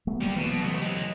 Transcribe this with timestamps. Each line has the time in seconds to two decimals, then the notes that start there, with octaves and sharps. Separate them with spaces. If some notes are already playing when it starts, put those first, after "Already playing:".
0.07 F#3 A3 B3
0.21 G3 A#3 G4
0.36 B2 E3 F#3
0.61 C#3 A3
0.78 G4 D#5